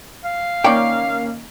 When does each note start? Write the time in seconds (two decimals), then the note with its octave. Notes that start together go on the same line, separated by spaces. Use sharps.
0.25 F5
0.64 D#3 A#3 C#4 C#5 D5 G5